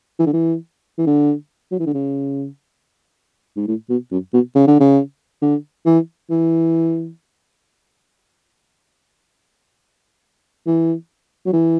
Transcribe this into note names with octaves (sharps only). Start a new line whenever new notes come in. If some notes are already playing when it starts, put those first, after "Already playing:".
E3
D3
E3
E3
D3
F#3
E3
D3
C#3
G#2
A2
B2
F#2
B2
C#3
D3
C#3
D3
E3
E3
E3
F#3
E3